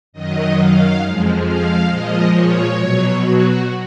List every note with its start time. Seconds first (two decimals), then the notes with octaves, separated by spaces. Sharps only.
0.13 F#2 D#3 F#3 D#5
0.57 F5
1.01 F2 F3 G#3
1.44 F5
1.88 A#2 F3 G#3 D#5
2.31 C#5
2.76 B2 F#3
3.19 F#4